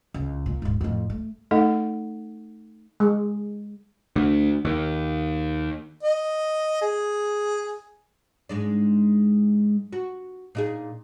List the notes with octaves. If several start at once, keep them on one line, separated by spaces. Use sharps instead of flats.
C#2
A#2
D1 G#2
F2 A2
A3
A3 D#4 A4 D#5 F#5
G#3
D2
D#2
D#5
G#4
G#2 G#3 D4
F#4
A#2 D#4 G#4